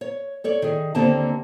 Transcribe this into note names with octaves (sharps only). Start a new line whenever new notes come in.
C#5
A4 C#5 D5
D#3 G#4
D#2 D3 A#3 C4 G4 A5